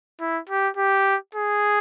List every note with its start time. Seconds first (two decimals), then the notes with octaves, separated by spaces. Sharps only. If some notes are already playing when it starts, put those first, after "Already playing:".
0.20 E4
0.49 G4
0.77 G4
1.35 G#4